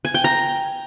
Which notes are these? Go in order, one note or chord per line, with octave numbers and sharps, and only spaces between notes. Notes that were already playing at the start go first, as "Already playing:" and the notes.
G#5
G5
A#5